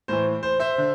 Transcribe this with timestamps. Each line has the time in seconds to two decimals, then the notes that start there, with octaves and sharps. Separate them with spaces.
0.08 A2 E3 C5
0.43 C5
0.60 C5 E5
0.78 D3